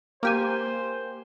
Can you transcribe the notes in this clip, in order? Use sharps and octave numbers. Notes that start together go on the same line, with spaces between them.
A#3 G4 C5 G#5